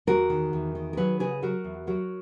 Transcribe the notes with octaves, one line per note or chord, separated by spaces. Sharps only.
E2 F#4 A#4
D#3
E2
D#3
A#4
F#3 G#4 B4
C#3 G#4 B4
F#3 F#4 A#4
E2
F#3 F#4 A#4